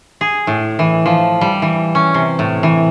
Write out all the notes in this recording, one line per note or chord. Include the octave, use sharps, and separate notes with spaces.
G#4
A2
E3
F3
G3
E3
C#4
C3
A2
E3